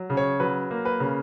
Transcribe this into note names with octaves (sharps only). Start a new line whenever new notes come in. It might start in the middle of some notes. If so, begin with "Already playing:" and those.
Already playing: F#3
C#3
C#5
F#3 B4
A#3
B4
C#3